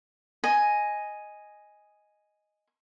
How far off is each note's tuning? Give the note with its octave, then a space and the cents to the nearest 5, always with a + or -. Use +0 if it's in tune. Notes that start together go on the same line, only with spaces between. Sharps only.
D#5 +0 G#5 +0